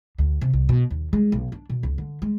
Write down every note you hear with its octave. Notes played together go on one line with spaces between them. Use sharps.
D2
C3
C2
B2
D#2
G#3
B1
D4
B2
C#2
D3
G#3